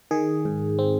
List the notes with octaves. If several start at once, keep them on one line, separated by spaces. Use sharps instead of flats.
D#3 G#4
G#2
C4